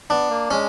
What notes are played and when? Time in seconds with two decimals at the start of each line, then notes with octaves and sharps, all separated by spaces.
0.10 B3 D4
0.30 A#3
0.50 G#3 C#4